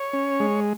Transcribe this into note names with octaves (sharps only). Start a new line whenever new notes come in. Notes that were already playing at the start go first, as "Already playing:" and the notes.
Already playing: C#5
C#4
G#3